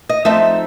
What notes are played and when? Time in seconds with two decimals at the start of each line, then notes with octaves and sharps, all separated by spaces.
0.09 D#5
0.25 F3 A3 C4 D#4 E5